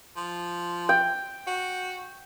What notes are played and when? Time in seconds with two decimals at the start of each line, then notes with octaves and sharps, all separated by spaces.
0.16 F3
0.89 G5
1.47 F#4